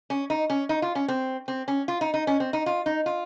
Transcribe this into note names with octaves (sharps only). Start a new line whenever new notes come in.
C#4
D#4
C#4
D#4
F4
C#4
C4
C4
C#4
F4
D#4
D#4
C#4
C4
D#4
F4
D#4
F4